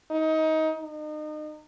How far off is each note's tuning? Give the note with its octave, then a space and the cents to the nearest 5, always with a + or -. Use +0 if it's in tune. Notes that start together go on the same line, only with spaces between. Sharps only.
D#4 +25
D#4 -35